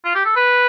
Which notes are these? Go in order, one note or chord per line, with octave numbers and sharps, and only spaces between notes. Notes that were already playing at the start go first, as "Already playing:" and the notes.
F4
G4
A4
B4